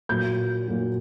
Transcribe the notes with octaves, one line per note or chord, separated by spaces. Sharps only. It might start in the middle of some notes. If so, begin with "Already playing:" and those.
A#2 F#3 G6
A#2 F#3